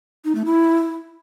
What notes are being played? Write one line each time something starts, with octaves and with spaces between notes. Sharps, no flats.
D#4
A3
E4